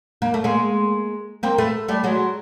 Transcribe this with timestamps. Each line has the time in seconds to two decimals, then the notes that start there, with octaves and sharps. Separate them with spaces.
0.22 A#3
0.34 A3
0.44 G#3 A#3
1.43 A#3 C4
1.58 A3 B3
1.88 G3 A3
2.04 F#3 G#3